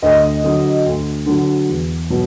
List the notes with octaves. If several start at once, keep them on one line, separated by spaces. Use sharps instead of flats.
D2 D#5
D3 F#3
D2
D3 F#3
E2
B2 F#3